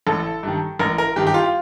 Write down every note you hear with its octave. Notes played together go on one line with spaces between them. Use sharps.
A1 A4
G2 D#3
A1 A#4
A#4
G2 D#3 G4
G4
F4